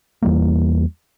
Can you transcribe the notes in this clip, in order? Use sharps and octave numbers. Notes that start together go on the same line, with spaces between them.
E2 E3 G3 A#3